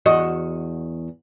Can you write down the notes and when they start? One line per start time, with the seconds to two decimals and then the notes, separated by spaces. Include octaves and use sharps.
0.06 E2 F#4 D#5